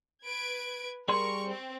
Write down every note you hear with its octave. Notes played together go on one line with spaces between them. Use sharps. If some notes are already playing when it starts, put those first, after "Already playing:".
B4 G#6 D7
G3 G#4 A#4 C6 C#6
C4